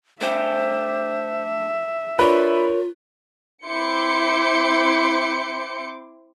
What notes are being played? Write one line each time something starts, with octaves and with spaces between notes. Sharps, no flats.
A3 D4 G4 C5 E5
D4 F4 A#4 B4 C#5
C4 E4 C6 D6 G6 C#7